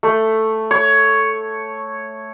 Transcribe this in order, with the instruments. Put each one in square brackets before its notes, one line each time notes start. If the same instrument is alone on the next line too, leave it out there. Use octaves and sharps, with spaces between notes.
[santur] A3
C#5